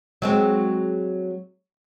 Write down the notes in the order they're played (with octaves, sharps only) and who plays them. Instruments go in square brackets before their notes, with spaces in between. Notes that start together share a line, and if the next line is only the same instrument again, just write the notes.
[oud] F#3 G#3 C4